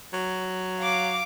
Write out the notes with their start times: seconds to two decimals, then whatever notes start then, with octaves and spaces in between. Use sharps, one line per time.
0.13 F#3
0.80 F5 D6